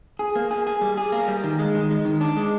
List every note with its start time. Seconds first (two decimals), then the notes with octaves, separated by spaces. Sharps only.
0.19 G#4
0.36 A#3
0.51 G#4
0.67 G#4
0.81 G3
0.97 G#4
1.12 A#3
1.28 G3
1.44 D#3
1.59 G#3
1.75 D#3
1.91 G#3
2.05 D#3
2.21 D4
2.37 G#3